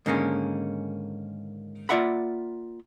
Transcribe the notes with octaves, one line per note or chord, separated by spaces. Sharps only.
G#2 D3 D#3 A#3 B3 C#4
A#3 F4 D5 E5 F#5 B5